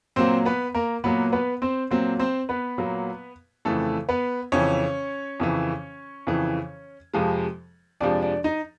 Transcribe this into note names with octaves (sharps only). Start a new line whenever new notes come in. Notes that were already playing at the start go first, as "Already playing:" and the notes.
A#2 F#3 A#3 C4 C5
B3 B4
A#3 A#4
A#2 F#3 A#3 B3 B4
B3 B4
C4 C5
A#2 F#3 A#3 C4 C5
C4 C5
B3 B4
A#2 F#3 A#3
F2 C#3 E3 A3 A4
B3 B4
F2 C#3 E3 C#4 C#5
F2 C#3 E3
F2 C#3 E3
F2 C3 F3 G#3
F2 C3 F3 G#3 D4 D5
D4 D5
D#4 D#5